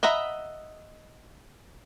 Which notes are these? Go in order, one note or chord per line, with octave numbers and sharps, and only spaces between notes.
D#5 E5 F#5 A#5 B5